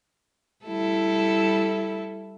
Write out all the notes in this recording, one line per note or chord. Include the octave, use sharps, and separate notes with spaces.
G3 E4 A4